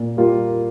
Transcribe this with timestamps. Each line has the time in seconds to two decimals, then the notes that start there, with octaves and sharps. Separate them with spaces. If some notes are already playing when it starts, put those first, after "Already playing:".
Already playing: A#2
0.17 G3 A#3 F4